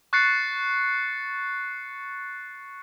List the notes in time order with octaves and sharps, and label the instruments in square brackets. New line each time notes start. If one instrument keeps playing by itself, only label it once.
[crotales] C#6 F#6 A6 C7 C#7